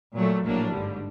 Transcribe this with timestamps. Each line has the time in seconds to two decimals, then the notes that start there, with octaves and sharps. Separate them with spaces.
0.16 A#2 F#3 A3
0.45 A#1 A2 F#3 A#3 D4
0.73 G#1 G2 D3 G3